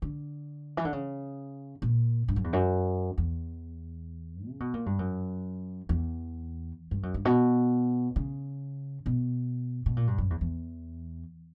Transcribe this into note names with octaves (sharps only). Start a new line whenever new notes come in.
D3
E3
D3
C#3
A#2
G2
F#2
E2
F#2
E2
C#3
B2
A#2
G2
F#2
E2
G2
F#2
G2
B2
C#3
B2
B2
A#2
G2
F#2
E2
E2